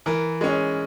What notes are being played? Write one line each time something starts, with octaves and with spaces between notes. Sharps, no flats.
E3 A#4
G#3 C#4